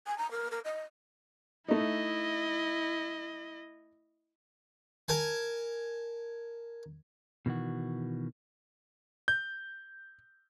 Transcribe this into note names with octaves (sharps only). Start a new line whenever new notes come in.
G#5
A#5
A#4
A#4
D#5
A3 D#4 E4 D#5
A#4 G#5 A5
B2 D#3 E3 F#4
G6